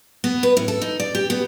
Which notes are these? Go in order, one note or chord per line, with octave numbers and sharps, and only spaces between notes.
B3
B4
A2
A4
D#4
D5
G4
B3